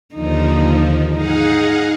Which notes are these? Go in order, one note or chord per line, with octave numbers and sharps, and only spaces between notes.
D#2 D3 F3 D#4
G#2 D#4 G#4 F5 F#5